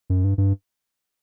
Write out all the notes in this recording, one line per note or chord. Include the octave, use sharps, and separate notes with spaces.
F#2
G2
G2